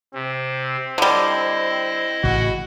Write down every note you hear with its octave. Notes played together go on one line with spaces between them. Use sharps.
C3 C4
D3 G3 E4 D#5
A1 A2 C#3 F#4